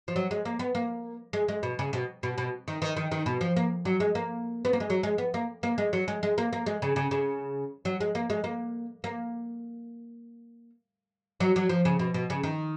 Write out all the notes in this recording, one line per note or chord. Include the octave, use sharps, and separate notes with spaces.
F3
F#3
G#3
A#3
B3
A#3
G#3
G#3
B2
C#3
B2
B2
B2
D#3
D#3
D#3
D#3
B2
F3
A#3
F#3
G#3
A#3
B3
A#3
G#3
F#3
G#3
B3
A#3
A#3
G#3
F#3
G#3
G#3
A#3
A#3
G#3
C#3
C#3
C#3
F#3
G#3
A#3
G#3
A#3
A#3
F#3
F#3
F3
C#3
B2
B2
C#3
D#3